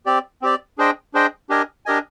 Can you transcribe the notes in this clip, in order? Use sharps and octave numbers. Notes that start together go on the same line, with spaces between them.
C4 G4 D5
C4 G4 D5
D4 G#4 C5 D#5 G5
D4 G#4 C5 D#5 G5
D4 G4 A#4 D#5 G#5
D4 G4 A#4 D#5 G#5